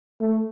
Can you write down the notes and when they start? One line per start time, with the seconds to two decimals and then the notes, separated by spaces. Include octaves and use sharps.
0.21 A3